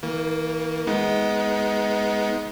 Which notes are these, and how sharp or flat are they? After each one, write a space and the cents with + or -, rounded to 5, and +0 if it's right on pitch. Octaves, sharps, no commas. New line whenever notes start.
E3 -40 A#3 +0
G#3 +0 B3 +0 D#4 +25